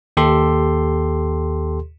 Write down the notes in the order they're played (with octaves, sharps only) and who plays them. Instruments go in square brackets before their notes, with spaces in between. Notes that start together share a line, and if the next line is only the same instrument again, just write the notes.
[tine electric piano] D#2 G4 A4 C6